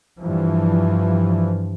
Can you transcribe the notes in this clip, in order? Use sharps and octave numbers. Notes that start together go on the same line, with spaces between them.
G2 E3 F3